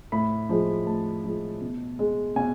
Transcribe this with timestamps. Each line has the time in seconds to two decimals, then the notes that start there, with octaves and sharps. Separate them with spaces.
0.12 A2 B5
0.49 F3 G#3
0.86 A2 A5
1.24 F3 G#3
1.61 B2
1.99 G#3
2.36 B2 G#5